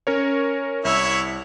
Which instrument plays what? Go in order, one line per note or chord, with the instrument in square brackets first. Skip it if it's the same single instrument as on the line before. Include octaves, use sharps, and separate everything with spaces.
[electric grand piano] C#4 A#4 C#5
[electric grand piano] C2 [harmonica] E4 C#5 E5